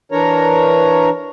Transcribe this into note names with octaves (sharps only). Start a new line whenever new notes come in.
E3 D4 A#4 C#5 A#5